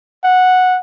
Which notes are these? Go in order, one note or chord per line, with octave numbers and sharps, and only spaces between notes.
F#5